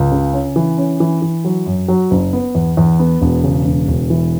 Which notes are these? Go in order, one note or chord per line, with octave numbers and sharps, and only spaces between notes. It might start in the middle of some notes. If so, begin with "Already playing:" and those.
Already playing: C#2
C#3
C#4
E3
C#4
E3
E3
F#3
F#2
F#3
F#1
B3
E2
E2
B3
E1
C#3
E1
E1
E3